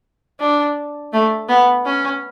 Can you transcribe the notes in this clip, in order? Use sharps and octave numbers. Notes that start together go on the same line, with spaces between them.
D4
A3
B3
C#4